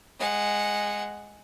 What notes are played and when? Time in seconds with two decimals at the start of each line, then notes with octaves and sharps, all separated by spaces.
0.19 G#3 F#5